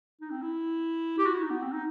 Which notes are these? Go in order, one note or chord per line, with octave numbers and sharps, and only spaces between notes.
D#4
C4
E4
G4
F#4
E4
D#4
B3
C4
D#4